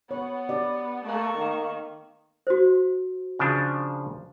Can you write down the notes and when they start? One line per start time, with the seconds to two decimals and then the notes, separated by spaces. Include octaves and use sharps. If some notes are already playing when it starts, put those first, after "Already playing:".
0.11 B3 C#5
0.49 G4 D5
1.05 A3 A#3 C#6
1.38 D#3
2.47 F#4 C5
3.39 C#3 F3 D4